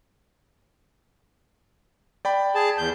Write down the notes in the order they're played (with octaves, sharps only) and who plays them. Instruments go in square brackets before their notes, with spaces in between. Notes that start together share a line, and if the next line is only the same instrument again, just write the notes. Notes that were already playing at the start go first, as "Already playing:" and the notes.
[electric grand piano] D5 G5 B5
[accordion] G#4 A5
E2 G6